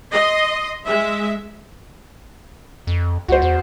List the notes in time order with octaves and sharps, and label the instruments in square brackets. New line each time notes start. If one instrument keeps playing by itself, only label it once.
[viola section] D#5 C6
G#3 E5
[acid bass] F2
[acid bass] C#2 [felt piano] F#4 C5
[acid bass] E2